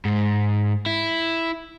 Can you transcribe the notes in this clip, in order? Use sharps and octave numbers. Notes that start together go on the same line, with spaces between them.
G#2
E4